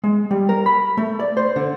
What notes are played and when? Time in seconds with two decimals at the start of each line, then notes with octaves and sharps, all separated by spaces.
0.04 G#3
0.31 G3
0.49 A#4
0.66 B5
0.97 A3
1.20 D5
1.37 C5
1.56 D3